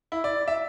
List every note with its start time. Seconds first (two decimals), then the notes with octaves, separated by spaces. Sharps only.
0.12 E4
0.24 D5
0.48 E5